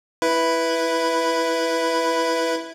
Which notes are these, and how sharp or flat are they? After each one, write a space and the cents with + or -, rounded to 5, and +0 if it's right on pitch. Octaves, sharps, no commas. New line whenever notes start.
E4 +0 B4 +0